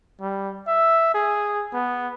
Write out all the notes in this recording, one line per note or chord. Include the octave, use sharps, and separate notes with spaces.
G3
E5
G#4
B3